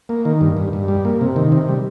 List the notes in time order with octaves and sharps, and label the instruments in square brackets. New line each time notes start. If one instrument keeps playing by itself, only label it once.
[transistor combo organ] A#3
D#3
G2
G2
G2
G3
A#3
C3
D#3
C3
G3